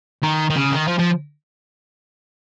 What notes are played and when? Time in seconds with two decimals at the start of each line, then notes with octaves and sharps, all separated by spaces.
0.23 D#3
0.50 D#3
0.56 C#3
0.71 D#3
0.88 F3
0.99 F3